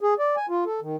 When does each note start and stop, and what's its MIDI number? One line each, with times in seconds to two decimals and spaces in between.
0.01 0.14 68
0.19 0.36 74
0.37 0.46 80
0.49 0.64 65
0.66 0.80 69
0.82 0.96 51